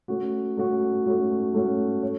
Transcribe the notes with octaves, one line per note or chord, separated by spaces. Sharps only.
A3 C#4 F#4
A3 C#4 F#4
A3 C#4 F#4
A3 C#4 F#4
C#5